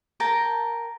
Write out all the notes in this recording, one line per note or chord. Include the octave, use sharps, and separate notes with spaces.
A#4 G5 A5